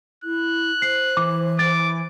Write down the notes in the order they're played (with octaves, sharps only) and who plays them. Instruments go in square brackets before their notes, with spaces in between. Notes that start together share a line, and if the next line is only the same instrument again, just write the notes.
[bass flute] E4 [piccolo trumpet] F#6
[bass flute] C5 [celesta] C7
[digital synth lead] E3 [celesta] D6
[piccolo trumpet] D6 [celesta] A6